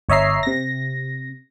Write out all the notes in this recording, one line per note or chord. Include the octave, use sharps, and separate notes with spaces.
G1 C#5 D#5 E5 A#5 C7
C3 A#6